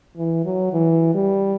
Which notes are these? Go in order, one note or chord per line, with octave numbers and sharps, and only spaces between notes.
E3
F#3
E3
G3